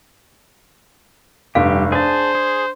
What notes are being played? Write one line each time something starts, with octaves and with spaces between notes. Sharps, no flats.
F1 G2 G3 G4 F5
D4 G#4 C5 A5
G#4